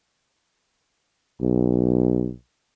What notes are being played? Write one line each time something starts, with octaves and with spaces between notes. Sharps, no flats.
B1